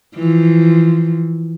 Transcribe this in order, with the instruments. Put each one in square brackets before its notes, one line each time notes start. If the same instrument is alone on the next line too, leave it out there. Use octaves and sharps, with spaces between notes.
[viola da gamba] E3 F3